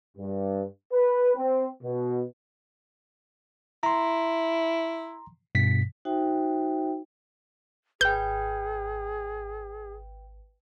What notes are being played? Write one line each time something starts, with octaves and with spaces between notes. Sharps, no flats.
G2
B4
C4
B2
E4 A#5 C6
G2 B2 B6
D#4 F#4 C5 E5 G5
G#1 G#4 B4 G5 G6